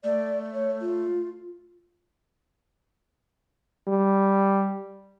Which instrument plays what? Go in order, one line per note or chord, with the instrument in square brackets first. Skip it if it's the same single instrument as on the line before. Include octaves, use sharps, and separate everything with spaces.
[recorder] A3 [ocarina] D5
[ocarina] C#5
F4
[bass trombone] G3